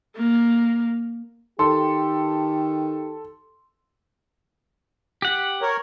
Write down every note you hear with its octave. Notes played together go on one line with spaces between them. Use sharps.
A#3
D#3 G4 A4 C6
G4 F#5
A#4 C#5